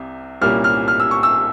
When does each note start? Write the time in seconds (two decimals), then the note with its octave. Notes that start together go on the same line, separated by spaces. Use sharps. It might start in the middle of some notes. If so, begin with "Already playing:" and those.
Already playing: C2 C3
0.41 C2 A#2 G3 A#3 C#4 F6
0.64 F6
0.88 F6
1.00 E6
1.11 C#6
1.23 E6